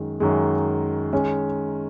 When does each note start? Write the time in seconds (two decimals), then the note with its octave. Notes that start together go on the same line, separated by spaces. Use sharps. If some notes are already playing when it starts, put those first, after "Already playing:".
Already playing: F#2 D#3 G#3
0.20 F#2 D#3 G#3
1.13 D#3 G#3 C#4